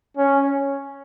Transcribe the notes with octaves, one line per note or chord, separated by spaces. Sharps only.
C#4